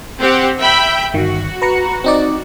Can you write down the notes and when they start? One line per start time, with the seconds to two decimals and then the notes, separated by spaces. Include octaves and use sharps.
0.19 C4 G4 F#5
0.60 E5 G5 B5
1.14 G1 D#3 F#4
1.62 B4 A#5 C#7
2.04 C4 D#4 D5